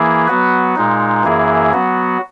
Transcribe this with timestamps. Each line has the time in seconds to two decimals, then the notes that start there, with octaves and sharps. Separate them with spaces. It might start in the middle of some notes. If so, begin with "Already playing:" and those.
Already playing: E3 A#3 E4 G#4
0.27 F#3 B3 F#4 B4
0.76 A#2 G#3 D#4
1.24 F#2 E3 A#3 E4 G#4
1.73 F#3 B3 F#4